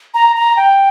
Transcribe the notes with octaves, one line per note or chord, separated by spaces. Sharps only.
A#5
A#5
G5